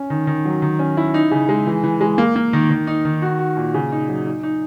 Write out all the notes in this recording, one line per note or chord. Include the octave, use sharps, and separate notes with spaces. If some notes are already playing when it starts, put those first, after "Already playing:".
Already playing: C#4
D#3
D#3
F#3
D#3
C#4
E4
D#4
C#3
G#3
E3
E3
G#3
A#3
A#3
D#3
D#3
D#4
D#3
F#4
F#4
A#2
C#3
D#4
F#3
D#4
D#4